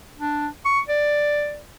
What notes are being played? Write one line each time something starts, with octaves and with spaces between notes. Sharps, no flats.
D4
C#6
D5